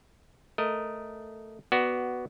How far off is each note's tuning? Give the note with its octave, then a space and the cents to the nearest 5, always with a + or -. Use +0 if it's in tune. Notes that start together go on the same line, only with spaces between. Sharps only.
A3 +0 A#4 +0 D#5 +0
B3 +0 F#4 +10 D5 +0